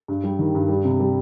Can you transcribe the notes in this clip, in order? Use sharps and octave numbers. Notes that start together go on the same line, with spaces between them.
G2
G3
D#3
G2
G3
C3
G3